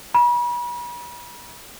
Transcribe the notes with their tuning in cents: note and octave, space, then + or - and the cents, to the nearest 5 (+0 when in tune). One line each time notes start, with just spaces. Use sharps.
B5 -40